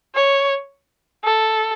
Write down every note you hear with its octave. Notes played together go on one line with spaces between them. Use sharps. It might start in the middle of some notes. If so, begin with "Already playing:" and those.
C#5
A4